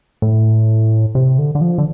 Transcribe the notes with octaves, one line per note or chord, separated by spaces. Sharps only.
A2
C3
D3
D3
F3
D3